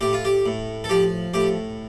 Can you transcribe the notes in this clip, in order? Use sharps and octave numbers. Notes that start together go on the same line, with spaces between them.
A2 G4
F4
G4
A2
A4
F3 G4
A2 G4